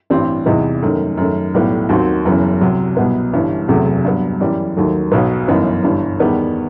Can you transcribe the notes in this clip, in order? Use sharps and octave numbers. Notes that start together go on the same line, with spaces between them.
A1 G2 E3 G3 C4
E2 C3 E3 B3 D#4
F#2 D#3 A3
F#2 D#3 A3
B1 A2 G3 B3
D#2 D#3 F#3 C4 F#4
F#1 F#2 E3 B3
C2 C3 F#3
C2 B2 F#3 B3
G1 G2 E3
F#1 E2 C3 F#3 A3
G2 F#3 B3
F#2 E3 G3
D#2 D#3 F#3 A3
B1 B2 F#3 B3
G1 F#2 E3 B3 D#4
G1 G2 E3
E2 D#3 G3 B3